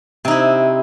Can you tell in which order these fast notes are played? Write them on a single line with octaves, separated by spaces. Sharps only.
C3 D#4 E4